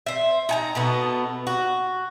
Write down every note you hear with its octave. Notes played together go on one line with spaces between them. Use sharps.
C5 E5
D#4 G#5 A#5
B2 A3 B3
F#4